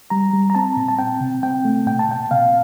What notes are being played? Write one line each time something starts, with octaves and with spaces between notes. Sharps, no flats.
G3 A#5
G3
A#5
C4 A5
A#2
A5
C4 G5
C3
C4 G5
A3
A#2 G5
A5
A#2 G5
C3 F5